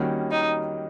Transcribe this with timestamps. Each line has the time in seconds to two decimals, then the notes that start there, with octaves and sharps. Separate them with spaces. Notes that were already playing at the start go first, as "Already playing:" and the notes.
Already playing: D#3 G3 A#3 C#4 F#4
0.31 D#4